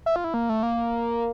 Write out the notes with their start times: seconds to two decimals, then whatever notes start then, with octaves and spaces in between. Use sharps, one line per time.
0.06 E5
0.16 F4
0.24 E4
0.34 A#3
0.49 A3
0.63 A#3